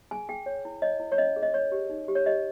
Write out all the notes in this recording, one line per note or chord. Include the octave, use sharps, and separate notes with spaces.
G#4 G#5
G#4 G5
C#5
E4
C#5 D#5
E4
C#5
C#4 D#5
G#4
D#5
C#5
G4
D#4
G4
C#5
G4 D#5